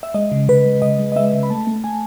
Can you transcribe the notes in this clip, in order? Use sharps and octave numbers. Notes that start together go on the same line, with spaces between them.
E5
G#3 D#5
C#3
C#3 B4
G#3
C#3 D#5
G#3
D#5
G#3 E5
C#3
B5
A3 A5
A3
A3 G#5